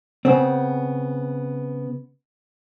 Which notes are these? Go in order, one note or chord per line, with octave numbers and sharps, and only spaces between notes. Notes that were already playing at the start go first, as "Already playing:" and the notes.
C#3 B3 C4